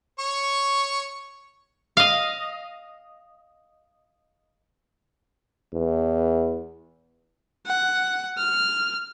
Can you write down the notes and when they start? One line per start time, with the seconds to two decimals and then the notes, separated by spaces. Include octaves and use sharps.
0.19 C#5 C#6
1.97 D#5 F5
5.74 E2
7.66 F#5
8.38 F6